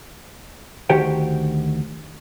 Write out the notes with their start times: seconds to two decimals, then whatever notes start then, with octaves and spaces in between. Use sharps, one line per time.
0.90 D2 D#3 F#4 G4 C5 G5